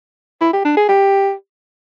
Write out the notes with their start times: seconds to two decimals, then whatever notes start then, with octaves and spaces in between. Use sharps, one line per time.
0.41 E4
0.53 G4
0.65 D4
0.77 G#4
0.89 G4